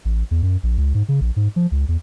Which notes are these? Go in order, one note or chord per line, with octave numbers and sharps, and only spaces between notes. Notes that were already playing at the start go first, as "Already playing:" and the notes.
A1
E2
F#2
A#1
C#2
G#2
C#3
A#1
G#2
F3
C#2
E2